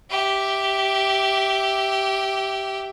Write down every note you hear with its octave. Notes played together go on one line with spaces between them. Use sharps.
G4 E5